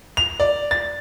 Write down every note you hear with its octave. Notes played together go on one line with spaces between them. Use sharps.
F7
D5
A6